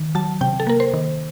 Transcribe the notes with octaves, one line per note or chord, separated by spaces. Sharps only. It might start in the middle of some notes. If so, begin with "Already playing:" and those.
Already playing: D#3
F#3 A5
C3 G5
A4
A#3 A#4
C5
D#3